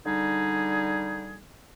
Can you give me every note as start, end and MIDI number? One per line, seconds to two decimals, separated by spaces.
0.06 1.38 50
0.06 1.38 55
0.06 1.38 63
0.06 1.38 68